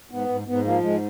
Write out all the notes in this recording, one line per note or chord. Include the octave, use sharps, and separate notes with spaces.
G#2 B3
G#2
G#2 B3
F3 A#3
G#2 G#3